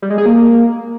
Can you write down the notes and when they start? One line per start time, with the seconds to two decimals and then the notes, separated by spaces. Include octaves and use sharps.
0.02 G3
0.10 G#3
0.18 G#4
0.26 A#3